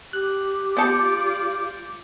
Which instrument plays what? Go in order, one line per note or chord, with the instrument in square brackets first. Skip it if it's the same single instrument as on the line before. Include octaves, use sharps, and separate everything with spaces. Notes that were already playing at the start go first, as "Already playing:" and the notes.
[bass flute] G4 [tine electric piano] F#6
[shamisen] B3 A5 [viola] F4 D5 [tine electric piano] D6 G6 C#7